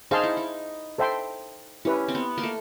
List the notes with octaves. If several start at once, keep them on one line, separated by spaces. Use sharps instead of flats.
D#4 G#4 C5 F5 A5 C6
E4
D#4
A4 C5 E5 G5 C6
C#4 E4 G4 B4 E5
C4
B3
A#3
A3